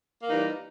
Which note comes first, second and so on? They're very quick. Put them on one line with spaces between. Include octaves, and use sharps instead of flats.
A#3 D#4 E3 G3